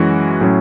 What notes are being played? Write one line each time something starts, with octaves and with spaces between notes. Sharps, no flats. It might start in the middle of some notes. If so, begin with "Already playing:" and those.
Already playing: F#2 E3 G#3 C#4 F#4
A2 F#3 C#4